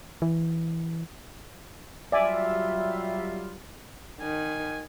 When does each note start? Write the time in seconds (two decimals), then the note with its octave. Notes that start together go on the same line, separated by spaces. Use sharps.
0.22 E3
2.12 F#3 G3 F4 D5 E5 G#5
4.21 D#3 G#5